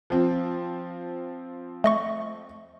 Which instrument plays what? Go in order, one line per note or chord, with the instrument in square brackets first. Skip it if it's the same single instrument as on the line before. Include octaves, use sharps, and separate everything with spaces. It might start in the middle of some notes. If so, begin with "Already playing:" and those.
[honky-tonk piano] F3 C4
[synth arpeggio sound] A3 D#5 C#6